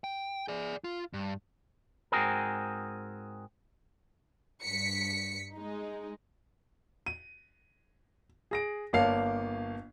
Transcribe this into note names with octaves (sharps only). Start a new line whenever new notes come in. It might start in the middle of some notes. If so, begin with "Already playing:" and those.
G5
G#4 D5
F4
G2
G#2 C4 F4 F#4 G#4 A#4
G2 B6 C#7
G#3 D#4
D#7
G#4 A#6 D7
G1 A#3 C#5 F5 A5 C7